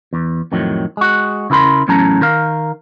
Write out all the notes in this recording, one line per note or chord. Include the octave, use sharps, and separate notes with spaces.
E2
F2 A2 D#3 F#3
G#3 F#4
C#3 E4 A#4 B5 C6
E2 A2 F#3 C#4 A5 A#5
D#3 A#4 F5